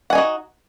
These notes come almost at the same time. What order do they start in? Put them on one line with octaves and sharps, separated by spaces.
F#5 G#5 D#4 F#4